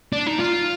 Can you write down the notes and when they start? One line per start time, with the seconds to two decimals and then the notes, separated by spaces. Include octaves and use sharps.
0.12 D4
0.26 D#4
0.39 F4